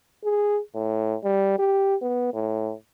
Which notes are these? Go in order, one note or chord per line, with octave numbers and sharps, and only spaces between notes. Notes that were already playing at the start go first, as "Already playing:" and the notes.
G#4
A2
G3
G4
B3
A2